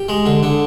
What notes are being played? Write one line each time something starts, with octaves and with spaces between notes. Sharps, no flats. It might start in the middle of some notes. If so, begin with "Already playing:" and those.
Already playing: G4
G#3
D3
D3